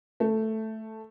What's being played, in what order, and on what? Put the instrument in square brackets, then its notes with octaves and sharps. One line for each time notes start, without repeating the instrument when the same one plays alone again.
[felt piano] A3